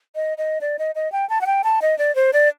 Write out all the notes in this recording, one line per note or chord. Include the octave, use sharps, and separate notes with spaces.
D#5
D#5
D5
D#5
D#5
G5
A5
F#5
G5
A5
D#5
D5
C5
D5